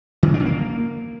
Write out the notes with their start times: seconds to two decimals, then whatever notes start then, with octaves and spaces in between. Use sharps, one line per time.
0.23 D#3
0.28 C#3
0.34 D4
0.40 C#3
0.45 A#3